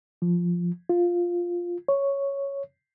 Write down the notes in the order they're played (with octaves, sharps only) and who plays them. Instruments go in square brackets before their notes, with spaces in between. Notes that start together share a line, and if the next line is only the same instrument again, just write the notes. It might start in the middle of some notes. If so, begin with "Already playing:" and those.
[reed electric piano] F3
F4
C#5